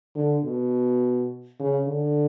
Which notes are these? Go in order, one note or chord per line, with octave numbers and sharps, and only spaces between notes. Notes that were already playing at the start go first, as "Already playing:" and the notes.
D3
B2
C#3
D3